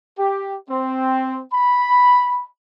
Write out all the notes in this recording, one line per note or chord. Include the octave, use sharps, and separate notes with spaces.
G4
C4
B5